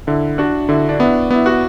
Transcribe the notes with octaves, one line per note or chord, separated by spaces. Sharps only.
D3 E4
D4 F#4
D3 E4
D4
B3 E4
B3 E4
F#4